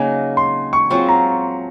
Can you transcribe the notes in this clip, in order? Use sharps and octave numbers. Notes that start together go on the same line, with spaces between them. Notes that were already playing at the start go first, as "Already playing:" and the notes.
Already playing: C#3 F#3 A#3 D#4 G#5
C6
C#6
F#3 C4 F4 G#4 C#6
A#5